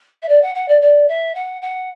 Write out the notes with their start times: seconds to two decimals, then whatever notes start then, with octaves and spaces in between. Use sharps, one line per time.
0.22 E5
0.28 D5
0.42 F#5
0.55 F#5
0.68 D5
0.81 D5
1.08 E5
1.35 F#5
1.61 F#5